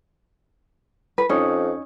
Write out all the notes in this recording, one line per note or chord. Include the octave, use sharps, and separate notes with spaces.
B4
F2 C#4 D#4